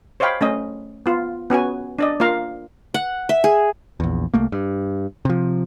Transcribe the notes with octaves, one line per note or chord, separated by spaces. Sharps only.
C5 C#5 D#5 F5 G5 B5
A3 C#4 D#5
B3 F4
B3 C#4 F#4 G#5
D4 D5 D#5
A#3 F4 F5 A#5
F#5
E5
G#4
A#1 E2
C2 A3 A#3
G2
C3 F3